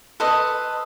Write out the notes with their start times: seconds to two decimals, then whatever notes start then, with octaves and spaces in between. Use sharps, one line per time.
0.20 A4 B4 C5 D#5